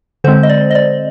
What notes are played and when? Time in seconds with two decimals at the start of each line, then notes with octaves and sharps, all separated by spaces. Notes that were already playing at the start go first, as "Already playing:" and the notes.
0.24 D3 G#3 C4 C5
0.43 D#5
0.49 D5
0.71 D#5
0.75 D5